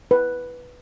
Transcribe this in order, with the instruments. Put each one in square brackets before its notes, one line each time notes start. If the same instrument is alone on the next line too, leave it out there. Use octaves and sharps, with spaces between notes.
[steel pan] B4